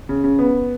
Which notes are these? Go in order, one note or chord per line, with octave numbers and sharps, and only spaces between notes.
C#3
C#3
B3